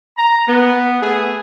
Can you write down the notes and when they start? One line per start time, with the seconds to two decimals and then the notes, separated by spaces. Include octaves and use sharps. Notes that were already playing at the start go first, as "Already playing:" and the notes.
0.17 A#5
0.47 B3
1.01 A3 B3 G#4